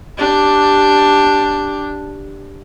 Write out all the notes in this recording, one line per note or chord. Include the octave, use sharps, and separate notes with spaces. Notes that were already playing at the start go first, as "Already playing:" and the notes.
D4 G4